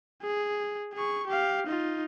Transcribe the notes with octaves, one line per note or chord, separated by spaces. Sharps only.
G#4
G#4 C#6
G4 F5
D#4 F4